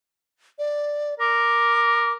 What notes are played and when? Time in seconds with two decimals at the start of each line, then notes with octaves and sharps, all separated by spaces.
0.59 D5
1.20 A#4 D6